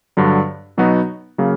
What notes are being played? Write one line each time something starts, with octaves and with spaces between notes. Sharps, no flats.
G2 D3 F#3
B2 F#3 B3 D#4 F#4
C#3 F#3 A#3